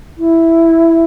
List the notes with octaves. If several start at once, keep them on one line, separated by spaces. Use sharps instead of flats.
E4